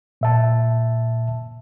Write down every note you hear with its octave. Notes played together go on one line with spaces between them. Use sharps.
A#2 E5 A5